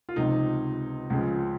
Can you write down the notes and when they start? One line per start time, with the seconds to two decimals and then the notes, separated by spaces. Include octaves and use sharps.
0.09 F4
0.16 C#2 C3 F3 D#4
1.10 C#2 C#3 F3